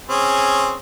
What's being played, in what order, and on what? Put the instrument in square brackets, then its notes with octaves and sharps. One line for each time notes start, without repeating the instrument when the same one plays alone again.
[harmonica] C4 C#4 G#4